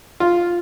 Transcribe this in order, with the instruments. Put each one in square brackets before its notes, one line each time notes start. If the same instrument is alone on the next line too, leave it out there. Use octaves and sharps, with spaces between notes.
[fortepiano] F4